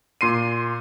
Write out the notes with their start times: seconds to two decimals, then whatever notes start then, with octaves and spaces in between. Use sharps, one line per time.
0.21 A#2 C6 C7 D#7